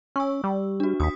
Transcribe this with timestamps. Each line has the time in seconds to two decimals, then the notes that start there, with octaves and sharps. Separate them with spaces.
0.16 C#4 C#6 E6
0.44 G3
0.80 D4 F#4
1.00 D#2 D#6 B6